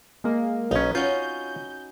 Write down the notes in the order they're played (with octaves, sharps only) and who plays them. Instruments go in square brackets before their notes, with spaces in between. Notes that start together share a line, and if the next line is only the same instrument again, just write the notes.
[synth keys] G#3 A#3
[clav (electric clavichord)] B1 C#4 [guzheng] D#4 B4
[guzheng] C#4 F#4 [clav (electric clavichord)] F4 [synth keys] G6